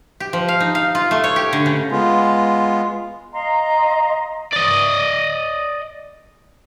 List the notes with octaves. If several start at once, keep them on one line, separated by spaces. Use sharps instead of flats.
G4
F3
F5
D#4
F5
F4
A3
C#5
G4
D3
C#3
G#3 B3 F4
D#5 F5 A#5 C6
D5 D#5